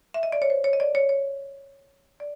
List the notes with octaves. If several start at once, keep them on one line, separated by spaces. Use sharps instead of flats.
E5
D#5
D5
C#5
C5
C#5
D#5
D5
C#5
C#5
D5